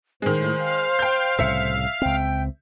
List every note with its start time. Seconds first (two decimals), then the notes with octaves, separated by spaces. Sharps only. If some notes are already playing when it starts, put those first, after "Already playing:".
0.22 A2 D#3 G#3 C5
0.59 F5
0.99 G5 G6
1.39 C2 A2 C#3 E5 C#7
2.02 C#2 C4 G5